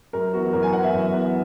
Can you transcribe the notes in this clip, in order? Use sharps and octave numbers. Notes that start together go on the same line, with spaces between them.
F#2 A#4
E3 B3 F#4
F#2 A#4
G#5
E3 B3 F#5
E5
F#2
E3 B3